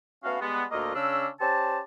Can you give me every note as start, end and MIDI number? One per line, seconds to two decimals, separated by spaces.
0.24 0.38 57
0.24 0.38 59
0.24 0.38 61
0.24 0.38 66
0.24 0.38 71
0.24 0.38 77
0.41 0.64 55
0.41 0.64 56
0.41 0.64 59
0.72 0.91 38
0.72 0.91 46
0.72 0.91 57
0.72 0.91 58
0.72 0.91 65
0.72 0.91 75
0.94 1.28 49
0.94 1.28 61
0.94 1.28 62
0.94 1.28 88
1.40 1.80 61
1.40 1.80 67
1.40 1.80 72
1.40 1.80 74
1.40 1.80 81